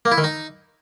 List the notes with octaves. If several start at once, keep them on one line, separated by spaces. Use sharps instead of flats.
A#3
E4
D#3
D#4